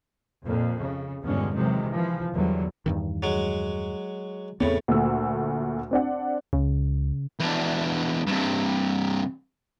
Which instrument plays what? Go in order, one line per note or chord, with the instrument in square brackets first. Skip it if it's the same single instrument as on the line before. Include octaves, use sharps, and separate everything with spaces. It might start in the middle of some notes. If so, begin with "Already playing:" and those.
[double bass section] F2 A#2
C#3
E2 G2 B2 D3 G#3 C#4
C3 D#3 E3 F#3 G#3
E3 F3
E2 D3 F#3 G3
[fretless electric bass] E2 G2 D#3
[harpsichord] F#3 G#3
[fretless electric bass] E2 B3 C4 [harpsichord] A2 C#3
[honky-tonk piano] D2 A#2 A3 E6
C4 D4 F#5
[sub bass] C#2 [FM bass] C#3
[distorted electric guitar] E2 D4
G2 C3